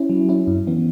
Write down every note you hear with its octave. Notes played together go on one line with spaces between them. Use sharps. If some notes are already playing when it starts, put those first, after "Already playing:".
Already playing: C#4 E4
F#3
C#4 E4
F#2
E3 B3